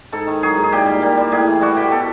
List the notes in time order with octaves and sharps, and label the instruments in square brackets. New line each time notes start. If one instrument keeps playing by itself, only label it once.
[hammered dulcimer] G#2 A4
D#3
F#3 G#4
G#2
G#4
A#2 G4
G3
A#2
G3
A2 G#4
E3
G3 F#4
A2 G4
B2 A4